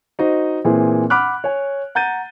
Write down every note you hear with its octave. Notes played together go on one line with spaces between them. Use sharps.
D#4 F#4 C5 D#5
A#2 E3 C4 E4 G#4
F#5 B5 D6 F6 F#6
C#5 G#5
F#5 A#5 G6 A6 D#7